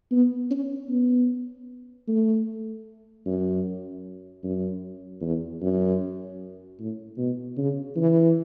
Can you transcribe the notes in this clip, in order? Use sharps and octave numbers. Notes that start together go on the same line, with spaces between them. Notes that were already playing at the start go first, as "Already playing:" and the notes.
B3
C#4
B3
A3
F#2
F#2
E2
F#2
A2
B2
C#3
E3